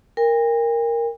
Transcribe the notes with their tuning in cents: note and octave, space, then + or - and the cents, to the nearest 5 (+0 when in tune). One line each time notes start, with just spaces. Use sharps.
A#4 +0 G5 +45